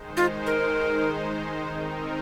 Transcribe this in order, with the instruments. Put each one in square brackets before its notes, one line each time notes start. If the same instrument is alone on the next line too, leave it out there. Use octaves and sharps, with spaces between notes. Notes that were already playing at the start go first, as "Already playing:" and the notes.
Already playing: [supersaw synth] D#3 G#3 D#4 C5
[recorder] F4
A#4
[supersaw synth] D#3 C4 D#4 A#4